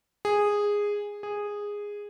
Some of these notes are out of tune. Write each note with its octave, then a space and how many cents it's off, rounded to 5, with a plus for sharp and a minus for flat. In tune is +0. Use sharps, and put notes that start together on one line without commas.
G#4 -10
G#4 -10